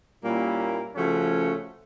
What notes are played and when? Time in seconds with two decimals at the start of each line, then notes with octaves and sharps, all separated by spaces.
0.23 A#2 G3 A#3 C#4 E4
0.95 C#3 F3 A3 C#4 F#4